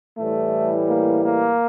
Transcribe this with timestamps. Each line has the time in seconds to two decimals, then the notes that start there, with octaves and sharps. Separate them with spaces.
0.18 A2 E3 G3 A3
0.88 A#3
1.24 A#3